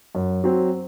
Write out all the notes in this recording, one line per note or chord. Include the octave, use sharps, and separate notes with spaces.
F#2
F#3 C4